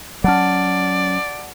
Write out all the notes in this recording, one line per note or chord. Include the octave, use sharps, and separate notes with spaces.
F#3 C#4 D5 F#5 A5 F6